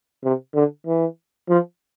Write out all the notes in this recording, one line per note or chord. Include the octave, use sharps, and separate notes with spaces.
C3
D3
E3
F3